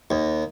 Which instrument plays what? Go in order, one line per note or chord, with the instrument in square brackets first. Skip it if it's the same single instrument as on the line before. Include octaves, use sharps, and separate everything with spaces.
[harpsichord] D#2